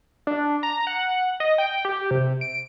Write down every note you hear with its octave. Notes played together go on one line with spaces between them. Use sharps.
D4
A#5
F#5
D#5
G5
G4
C3
D7